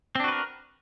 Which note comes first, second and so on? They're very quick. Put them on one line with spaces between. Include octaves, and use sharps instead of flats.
C4 D4 F#4 B4 A#4